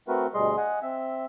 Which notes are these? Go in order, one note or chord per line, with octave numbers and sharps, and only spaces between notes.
A3 C4 F#4 A#4 B4
D2 B2 G3 G#4 D#5 C6
D#5 F#5 G#5
C4 E5